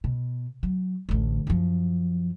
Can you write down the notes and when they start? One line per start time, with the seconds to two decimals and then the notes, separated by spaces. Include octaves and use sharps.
0.04 B2
0.63 F#3
1.09 A1 D2
1.47 F#2 F3